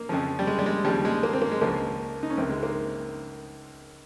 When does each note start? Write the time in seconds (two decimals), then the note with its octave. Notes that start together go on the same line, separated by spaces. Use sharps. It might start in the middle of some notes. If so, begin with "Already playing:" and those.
Already playing: A#3
0.09 F2 C#3 F3
0.39 G3
0.47 G#3
0.59 G3
0.66 G#3
0.85 D#2 C#3 F3 G3
1.05 G#3
1.23 A#3
1.33 C4
1.42 A#3
1.51 G#3
1.61 C#2 C#3 F3 A#3
2.23 D#4
2.30 C#4
2.37 C#2 C3 D#3 C4
2.49 G#3
2.63 A#3